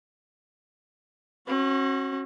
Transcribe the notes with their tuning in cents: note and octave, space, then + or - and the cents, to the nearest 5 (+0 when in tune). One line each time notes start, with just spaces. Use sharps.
C#4 -40 F#4 +0